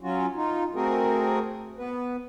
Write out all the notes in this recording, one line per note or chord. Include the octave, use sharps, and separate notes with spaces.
F#3 C#4 F4 F#4
D#4 F4
A3 C4 F#4 G#4 A#4
B3 B4